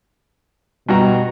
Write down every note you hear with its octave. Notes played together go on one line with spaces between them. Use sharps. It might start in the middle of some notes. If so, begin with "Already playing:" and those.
G2 B2 F#4 A#5